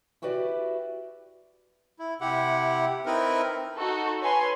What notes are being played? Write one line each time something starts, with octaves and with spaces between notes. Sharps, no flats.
E4 F#4 G4 B4 D5
E4
C3 E4 G4 F#5
C4 D#4 E4 A#4 B4
D#4 F#4 A4
B4 C#5 G#5 C6